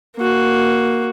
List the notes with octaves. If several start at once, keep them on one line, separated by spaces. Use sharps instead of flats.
A#3 F#4